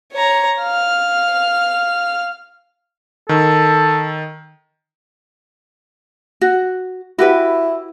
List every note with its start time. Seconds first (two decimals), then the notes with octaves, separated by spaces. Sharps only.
0.13 C#5 A#5
0.60 F5 F6
3.29 D#3 A4
6.41 F#4
7.19 E4 F#4 G4 B4